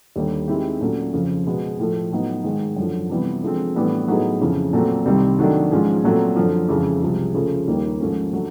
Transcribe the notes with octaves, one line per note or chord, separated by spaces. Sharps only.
D#2 D3 G3
D#3 G#3 C4 E4 G4
A#2 F#3 A3 C#4
F2 C#3 F3
B2 G#3 B3
A2 F3 A3
A2 F#3 B3 D#4
G#2 D#3 G#3
F#2 D3 F3
C3 E3 G3 B3
D3 F3 G#3 C4
A2 E3 G3 B3 D4
A2 F#3 B3 D#4 G#4
F2 C#3 E3
A#2 F#3 A3 C4
C2 C3 D#3 G3 C4
D#3 F#3 A3 D4
G#2 F3 G#3 C#4 F4
A#2 F#3 A3 C4
F#2 D3 F3
F2 C#3 E3 G#3
C2 C3 F3 G#3
C#3 F3 A3
D#2 D#3 G3 A#3
G#2 F3 A3 C#4
D3 F#3 A3